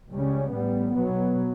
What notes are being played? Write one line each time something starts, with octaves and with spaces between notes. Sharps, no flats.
C#2 C#3 G3 C#4
A1 A2 G3 B3
B1 B2 F#3 B3